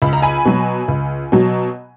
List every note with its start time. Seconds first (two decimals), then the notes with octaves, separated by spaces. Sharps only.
0.02 C#2 B5
0.13 A#5
0.22 G#5 B5
0.45 B2 F#3
0.88 C#2
1.32 B2 F#3